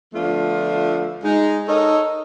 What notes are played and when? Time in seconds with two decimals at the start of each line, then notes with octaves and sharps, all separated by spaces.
0.14 D2 F3 A3 B3 D4 F4
1.24 G#3 D#4
1.68 D#4 A4 A#4 C#5 D#5